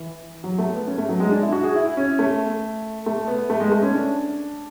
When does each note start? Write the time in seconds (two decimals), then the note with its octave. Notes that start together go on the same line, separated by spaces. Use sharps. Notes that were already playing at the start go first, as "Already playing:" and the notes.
Already playing: E3
0.44 F#3
0.58 A3
0.73 B3
0.87 C#4
0.98 A3
1.09 F#3
1.20 G#3
1.31 D4
1.42 E4
1.52 F#4
1.64 G#4
1.75 E4
1.97 C#4
2.19 A3
3.06 A3
3.28 B3
3.50 A3
3.60 G#3
3.72 A3
3.82 C#4
3.94 D4